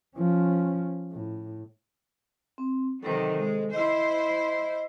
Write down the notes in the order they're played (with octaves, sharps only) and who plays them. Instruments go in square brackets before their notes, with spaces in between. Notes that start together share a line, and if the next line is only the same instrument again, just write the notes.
[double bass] F3 C#4
A2
[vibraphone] C4
[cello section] C3 D#3 F#3 [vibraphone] A4 C5
[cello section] G#3
[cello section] E4 C5 [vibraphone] D#5 E6